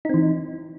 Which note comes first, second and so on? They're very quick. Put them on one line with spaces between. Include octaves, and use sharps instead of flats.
D#4 C4 E3